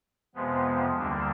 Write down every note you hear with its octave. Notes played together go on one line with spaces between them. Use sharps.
F2 C3 F3 G#3 B3
D2 D3 G3 A#3 D4